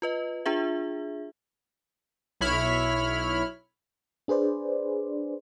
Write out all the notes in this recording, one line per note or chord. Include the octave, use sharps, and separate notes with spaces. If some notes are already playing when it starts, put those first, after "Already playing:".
F4 B4 D#5
D4 F4 G#4 E5
B1 E4 C#5 B5 F6
D4 G#4 B4 C5 D5